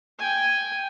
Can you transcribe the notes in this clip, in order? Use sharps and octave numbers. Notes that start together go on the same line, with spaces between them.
G5 G#5